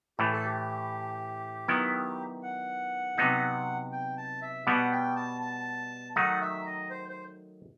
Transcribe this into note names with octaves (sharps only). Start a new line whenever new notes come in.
A2 E3 A3 G4
A4
G4
D#3 F#3 B3 E4
F#5
C3 F#3 B3 D#4
G5
A5
E5
B2 G3 B3 F#5
G5
A5
A5
D#3 F#3 A3 D#4 F#5
E5
D#5
C5
C5